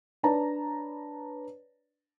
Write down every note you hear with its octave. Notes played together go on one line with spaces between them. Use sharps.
D4 B4 C#5 D5 A5 A#5